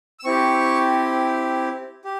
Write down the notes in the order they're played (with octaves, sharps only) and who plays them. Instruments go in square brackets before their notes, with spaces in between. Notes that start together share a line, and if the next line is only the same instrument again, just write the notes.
[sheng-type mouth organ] E6
C4 E4 G4 C#6
G4